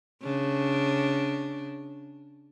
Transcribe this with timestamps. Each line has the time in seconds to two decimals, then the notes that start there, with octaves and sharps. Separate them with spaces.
0.22 C#3 D4